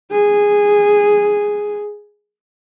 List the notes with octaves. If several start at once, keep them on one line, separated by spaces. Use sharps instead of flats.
G#4